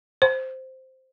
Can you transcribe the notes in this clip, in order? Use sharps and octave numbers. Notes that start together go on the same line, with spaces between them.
C5